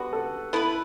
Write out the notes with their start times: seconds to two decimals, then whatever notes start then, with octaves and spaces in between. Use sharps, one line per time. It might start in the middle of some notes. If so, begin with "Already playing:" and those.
Already playing: D3 G3 B3 F#4 B4
0.13 A4
0.53 B3 E4 A4 B4